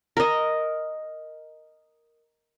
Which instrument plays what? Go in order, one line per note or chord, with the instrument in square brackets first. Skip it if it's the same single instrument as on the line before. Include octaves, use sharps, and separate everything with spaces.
[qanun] A#4 D#5